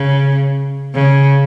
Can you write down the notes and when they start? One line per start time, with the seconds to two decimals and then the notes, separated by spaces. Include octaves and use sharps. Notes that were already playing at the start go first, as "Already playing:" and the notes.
Already playing: C#3
0.94 C#3